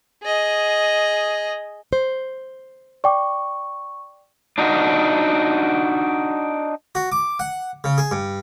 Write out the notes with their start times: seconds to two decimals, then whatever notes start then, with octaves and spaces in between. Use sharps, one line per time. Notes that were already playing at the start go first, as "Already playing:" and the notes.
0.23 G#4 D#5
1.93 C5
3.04 D5 G5 C#6 D6
4.58 D4 D#4 F#4
6.95 F#4
7.12 D6
7.39 F#5
7.84 C#3
7.98 G#4
8.11 G2